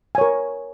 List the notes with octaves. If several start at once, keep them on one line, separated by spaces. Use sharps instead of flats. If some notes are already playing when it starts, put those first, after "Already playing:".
A#4 C#5 G#5